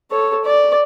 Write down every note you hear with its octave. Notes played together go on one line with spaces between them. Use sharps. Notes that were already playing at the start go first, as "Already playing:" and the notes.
A4 C#5
D5